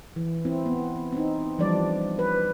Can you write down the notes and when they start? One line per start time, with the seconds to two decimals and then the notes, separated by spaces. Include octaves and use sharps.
0.16 E3
0.45 C4 E4
0.66 B3
1.12 C4 D#4
1.59 E3 F3 G3 D4 D5
2.19 B4